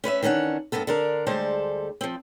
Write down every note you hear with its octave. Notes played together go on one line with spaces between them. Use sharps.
C#4 B4 D5 E5
D#3 E3 C#4 D4 F#5
G2 B2 A#3 B3 A4
D3 D4 A#4
D2 G3 G#3 A4 C5 D5
F3 C4